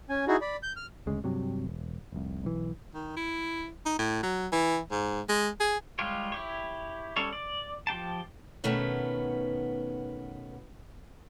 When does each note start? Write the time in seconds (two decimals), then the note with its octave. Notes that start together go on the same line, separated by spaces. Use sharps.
0.09 C#4 G#5
0.28 D#4 E4 F#4 G#4
0.41 D5 B5
0.63 G6
0.76 F6
1.06 G1 D2 C#3 G#3
1.24 G2 C3 F#3
1.64 E1
2.12 F1 C2
2.44 B1 E3
2.94 D#3
3.16 E4
3.86 D#4
3.98 A2
4.23 F#3
4.52 E3
4.91 G#2
5.29 G#3
5.60 G#4
5.99 G3 G#3 F4 G4 C#5
6.32 E4 G4 C#5
7.16 G3 C#4 A4 C#5
7.33 D5
7.87 F3 G4 G5 A5
8.64 B2 D#3 A3 B3 C#4 B4